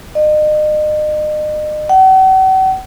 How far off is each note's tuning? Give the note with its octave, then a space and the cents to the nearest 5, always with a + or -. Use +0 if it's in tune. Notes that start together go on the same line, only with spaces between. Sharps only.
D#5 -40
F#5 +45